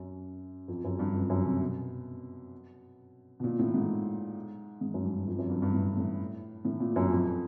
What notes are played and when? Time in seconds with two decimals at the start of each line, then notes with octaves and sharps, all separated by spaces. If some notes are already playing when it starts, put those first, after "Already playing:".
Already playing: F#2
0.68 F2
0.84 F#2
0.99 G2
1.14 F2
1.30 F#2
1.45 C3
1.60 B2
3.40 B2
3.44 A#2
3.59 A2
3.74 G#2
4.81 G#2
4.94 F#2
5.04 G2
5.27 F2
5.38 F#2
5.50 G2
5.62 G2
5.73 A2
5.97 A2
6.65 A2
6.80 A#2
6.96 F#2
7.11 F2